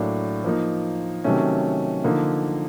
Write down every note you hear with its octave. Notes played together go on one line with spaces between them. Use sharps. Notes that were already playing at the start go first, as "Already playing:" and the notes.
Already playing: A2 F#3 A#3 D4
F3 A#3 D#4
C3 D#3 F#3 A3 C#4
D3 F3 A#3 D#4